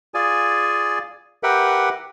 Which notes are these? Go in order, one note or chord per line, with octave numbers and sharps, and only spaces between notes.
F4 G#4 D5 G#5
G4 A#4 B4 E5 F#5 G5